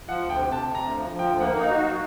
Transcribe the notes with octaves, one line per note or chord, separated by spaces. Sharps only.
F3 F#5
D2
G5
C3
C3 A5
C3
A#5
D2
F3
F3
G5
D2
A#3 F#5
D#4
F5
F#4
F#3